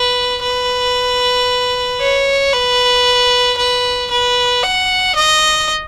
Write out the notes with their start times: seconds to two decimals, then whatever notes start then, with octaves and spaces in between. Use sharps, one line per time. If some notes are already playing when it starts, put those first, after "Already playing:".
Already playing: B4
0.43 B4
2.01 C#5
2.53 B4
3.57 B4
4.11 B4
4.63 F#5
5.15 D#5